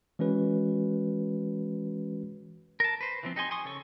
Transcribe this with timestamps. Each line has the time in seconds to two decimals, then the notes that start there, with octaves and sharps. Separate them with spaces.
0.19 E3 G#3 C#4 F#4 B4
2.80 A#4 A5
3.01 B4 C5
3.23 E3 F3 C4
3.36 D#4 G4 D#5 G#5 C6
3.51 G#5 C6 C#6 D#6
3.65 C#3 A4 C#5 C#6